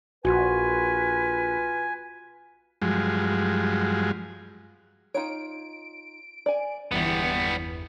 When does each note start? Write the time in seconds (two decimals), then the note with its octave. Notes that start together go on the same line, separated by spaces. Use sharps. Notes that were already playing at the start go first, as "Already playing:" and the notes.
0.25 A#1 F4 F#4 B4 G#5
2.82 G2 F3 F#3 G#3
5.14 D#4 F4 C#5 D7
6.46 D5 G#5
6.91 G1 E2 E3 G3 B3